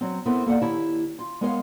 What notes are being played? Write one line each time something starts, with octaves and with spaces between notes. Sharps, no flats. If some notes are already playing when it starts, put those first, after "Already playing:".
F#3 C4
B3 C4 E4 A4 A#4
A#3 A4 D5 F#5
D#3 E4 G4 C#5 A5
F4
G#3 B3 A#4 C#5 D#5 F5